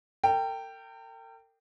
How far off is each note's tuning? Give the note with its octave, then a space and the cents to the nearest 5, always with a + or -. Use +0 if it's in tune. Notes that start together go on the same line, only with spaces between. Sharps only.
A#4 -45 G5 +0